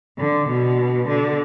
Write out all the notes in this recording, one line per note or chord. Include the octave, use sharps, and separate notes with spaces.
D3
B2
D3